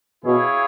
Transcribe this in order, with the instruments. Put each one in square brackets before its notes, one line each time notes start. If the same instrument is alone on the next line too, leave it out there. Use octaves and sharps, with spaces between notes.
[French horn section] B2 [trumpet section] E4 G#4 C#5 F5